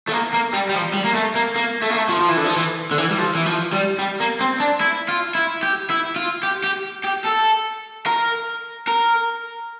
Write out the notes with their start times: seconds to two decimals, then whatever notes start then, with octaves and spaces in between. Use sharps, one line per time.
0.09 A3
0.13 A#3
0.34 A#3
0.53 G3
0.69 G3
0.74 F3
0.94 G3
1.04 A#3
1.15 A3
1.35 A#3
1.56 A#3
1.82 A3
1.90 A#3
1.97 A3
2.09 F3
2.21 F3
2.29 E3
2.37 D3
2.46 F3
2.57 E3
2.91 D3
2.98 E3
3.11 G3
3.18 F3
3.35 E3
3.46 F3
3.73 G3
3.99 G3
4.20 A#3
4.41 C4
4.60 D4
4.81 E4
5.09 F4
5.35 E4
5.63 G4
5.90 E4
6.16 F4
6.43 G4
6.64 G4
7.05 G4
7.25 A4
8.06 A#4
8.88 A#4